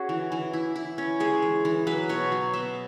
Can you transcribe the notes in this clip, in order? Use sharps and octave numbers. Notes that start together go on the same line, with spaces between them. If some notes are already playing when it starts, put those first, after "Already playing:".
Already playing: C#4 F#4 G#4
E3
E3
E4
E4
C#4
G#3 G#4
E3
E3
F#3 B4
B2 C#5
F#3
B3 E5